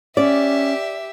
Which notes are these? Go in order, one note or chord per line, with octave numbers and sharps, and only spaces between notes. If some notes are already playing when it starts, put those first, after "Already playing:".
C#4 G4 D5 E5